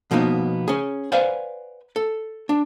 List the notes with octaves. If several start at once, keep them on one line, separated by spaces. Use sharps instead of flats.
B2 F3 A#3 B3 D#4
C#4 G#4
B4 C5 D5 F5 F#5 G#5
A4
D4